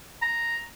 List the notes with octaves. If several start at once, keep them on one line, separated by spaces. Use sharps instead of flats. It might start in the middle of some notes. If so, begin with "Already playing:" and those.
A#5